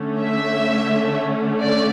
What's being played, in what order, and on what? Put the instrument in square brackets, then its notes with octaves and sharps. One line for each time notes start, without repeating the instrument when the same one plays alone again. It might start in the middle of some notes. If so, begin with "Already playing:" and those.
Already playing: [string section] D3 A3 C#4
E5
D5